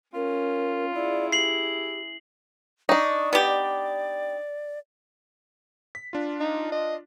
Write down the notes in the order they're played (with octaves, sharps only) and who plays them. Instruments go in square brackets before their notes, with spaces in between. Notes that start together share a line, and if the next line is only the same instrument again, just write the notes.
[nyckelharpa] C#4 [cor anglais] F4 [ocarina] A#4
[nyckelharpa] E4 G#4 [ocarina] D5
[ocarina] G4 [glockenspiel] C7 F#7
[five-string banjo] D4 D#4 [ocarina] C#6
[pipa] B3 G4 [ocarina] D5
[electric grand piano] B6
D4 F4
[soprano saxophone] D#4
D#5